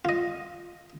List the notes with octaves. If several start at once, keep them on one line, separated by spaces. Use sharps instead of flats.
F4 D#5